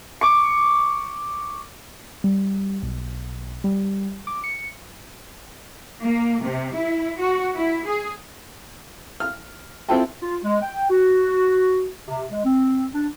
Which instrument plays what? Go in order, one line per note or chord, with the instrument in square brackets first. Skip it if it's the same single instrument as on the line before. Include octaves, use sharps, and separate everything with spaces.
[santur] C#6 D6
[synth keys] G3
B1
G3
D6
C#7
[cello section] A#3
C3
E4
F#4
E4
G#4
[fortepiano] F6
C4 E4 F4 A4 G5 A5
[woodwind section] F4
G#3
G5
F#4
C3
G#3
C4
D4